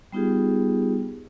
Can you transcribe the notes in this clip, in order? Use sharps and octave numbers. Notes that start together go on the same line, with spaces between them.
G3 B3 D#4 F4 G4 G#4